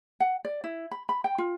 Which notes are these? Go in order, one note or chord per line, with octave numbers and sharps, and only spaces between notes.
F#5
D5
E4
B5
B5
G5
F4